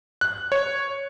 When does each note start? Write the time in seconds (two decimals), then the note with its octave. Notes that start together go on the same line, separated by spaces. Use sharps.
0.21 F#6
0.52 C#5